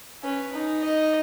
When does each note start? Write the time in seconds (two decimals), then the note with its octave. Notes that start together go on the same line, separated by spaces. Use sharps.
0.23 C#4 B4
0.53 D#4
0.83 D#5